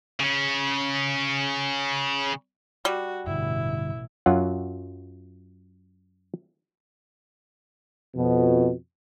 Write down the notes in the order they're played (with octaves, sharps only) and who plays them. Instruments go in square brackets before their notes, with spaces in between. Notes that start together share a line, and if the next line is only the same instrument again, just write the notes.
[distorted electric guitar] C#3 C#4
[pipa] G3 [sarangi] F#4
[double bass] A1 B2 [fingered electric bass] G2 D3 [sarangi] E4
[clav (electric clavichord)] F#2 F#3 F4 F#5
[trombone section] F2 B2